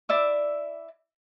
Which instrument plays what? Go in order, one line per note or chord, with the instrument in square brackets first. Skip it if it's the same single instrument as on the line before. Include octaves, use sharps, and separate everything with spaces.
[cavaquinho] E4 D5 E5 D6